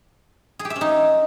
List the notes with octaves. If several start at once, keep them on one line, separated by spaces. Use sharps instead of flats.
G#4
G4
E5
C#4
D#4